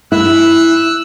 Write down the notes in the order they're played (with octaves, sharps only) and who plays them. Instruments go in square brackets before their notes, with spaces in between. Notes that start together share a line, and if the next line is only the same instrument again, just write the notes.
[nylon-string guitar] E4 [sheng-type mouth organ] E6 F#6